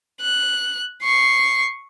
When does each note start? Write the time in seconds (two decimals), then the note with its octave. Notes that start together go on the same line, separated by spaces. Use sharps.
0.21 F#6
1.03 C#6 C7